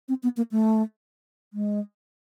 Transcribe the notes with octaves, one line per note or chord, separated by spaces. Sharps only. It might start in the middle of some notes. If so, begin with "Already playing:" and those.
C4
B3
A#3
A3
G#3